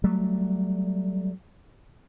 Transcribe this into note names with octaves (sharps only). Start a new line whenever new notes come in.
F#3 G3 A3